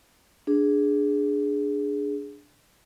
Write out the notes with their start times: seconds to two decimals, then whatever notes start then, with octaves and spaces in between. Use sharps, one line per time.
0.47 D4 G#4